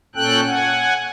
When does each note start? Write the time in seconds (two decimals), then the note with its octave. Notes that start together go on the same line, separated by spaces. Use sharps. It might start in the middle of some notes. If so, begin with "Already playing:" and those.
0.15 A#2 C#4 A4 G5 F#6
0.47 F#5 G#5